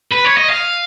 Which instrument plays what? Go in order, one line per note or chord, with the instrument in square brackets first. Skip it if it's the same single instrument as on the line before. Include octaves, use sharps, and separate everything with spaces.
[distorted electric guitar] B4
C#5
D#5
F5